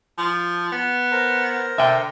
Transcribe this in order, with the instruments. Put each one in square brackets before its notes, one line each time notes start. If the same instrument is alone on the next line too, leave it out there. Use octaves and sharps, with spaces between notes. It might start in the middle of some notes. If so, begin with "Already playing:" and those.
[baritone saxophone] F3
B3
[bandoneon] A#4 C5 A#5
[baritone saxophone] D3 [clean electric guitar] E5 G5